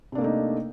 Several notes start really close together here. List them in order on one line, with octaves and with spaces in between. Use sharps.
C3 D4 A#3 A3 D#4